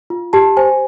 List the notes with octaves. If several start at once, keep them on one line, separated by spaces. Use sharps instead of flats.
F4
G4 A5
C5 G#5